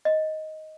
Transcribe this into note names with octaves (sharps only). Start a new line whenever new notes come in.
D#5